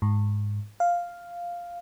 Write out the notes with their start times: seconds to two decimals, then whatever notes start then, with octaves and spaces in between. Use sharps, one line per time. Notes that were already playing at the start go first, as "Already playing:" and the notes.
0.02 G#2
0.80 F5